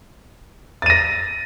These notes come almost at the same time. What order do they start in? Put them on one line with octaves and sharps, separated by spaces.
A6 D#7 A#6